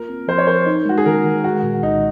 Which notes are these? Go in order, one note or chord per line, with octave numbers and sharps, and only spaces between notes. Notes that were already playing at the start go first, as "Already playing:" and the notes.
Already playing: A#3 F4 A#4
C4
F3 C5
C#5
A#4 C5
D#4
G#3 F#4
G#4
D#3 A#4
D#3
G#3 F#4
A#2
C2 D#4